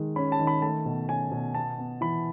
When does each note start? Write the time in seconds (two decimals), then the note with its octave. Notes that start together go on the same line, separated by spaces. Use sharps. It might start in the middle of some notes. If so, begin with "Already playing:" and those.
Already playing: D#3 G#3
0.16 C#4 B5
0.32 A5
0.39 D#3
0.47 B5
0.62 A3 A5
0.85 B2
1.09 C#4 G#5
1.31 B2
1.54 B3 A5
1.78 B3
2.01 E3 B5